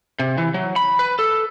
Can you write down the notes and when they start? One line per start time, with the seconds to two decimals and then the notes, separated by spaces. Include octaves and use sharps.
0.19 C3
0.38 E3
0.54 F#3
0.76 B5
0.99 B4
1.19 A4